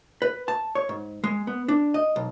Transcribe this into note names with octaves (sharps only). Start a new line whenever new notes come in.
B4
A5
C#5
G#2
G#3
B3
D4
D#5
B1